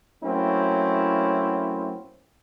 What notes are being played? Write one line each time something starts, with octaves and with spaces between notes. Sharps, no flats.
F#3 A3 A#3 C4 C#4 E4